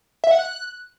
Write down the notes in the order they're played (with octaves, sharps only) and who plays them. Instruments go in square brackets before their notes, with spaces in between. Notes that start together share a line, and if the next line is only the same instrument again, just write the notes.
[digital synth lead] E5
F#5
F#6